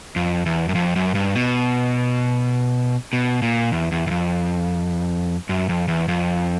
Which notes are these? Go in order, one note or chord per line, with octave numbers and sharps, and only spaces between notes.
F2
E2
F#2
F2
F#2
G2
B2
B2
A#2
E2
E2
E2
F2
F#2
F2
E2
F2